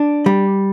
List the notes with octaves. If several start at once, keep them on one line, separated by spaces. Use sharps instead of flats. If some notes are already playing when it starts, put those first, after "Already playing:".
Already playing: D4
G3